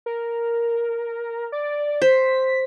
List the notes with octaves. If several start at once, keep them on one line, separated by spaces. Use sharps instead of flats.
A#4
D5
C5 B6